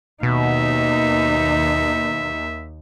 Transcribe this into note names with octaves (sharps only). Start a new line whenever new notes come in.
D#2 B2 D#4 E5